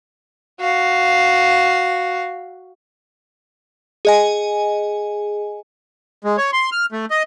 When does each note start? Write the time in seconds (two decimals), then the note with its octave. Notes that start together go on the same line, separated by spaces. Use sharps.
0.61 F#4 F5
4.05 G#4 D#5 G#5
6.24 G#3
6.38 C#5
6.53 C6
6.72 F6
6.92 A3
7.11 D#5